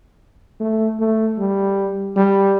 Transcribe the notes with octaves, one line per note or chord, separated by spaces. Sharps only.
A3
A3
G3
G3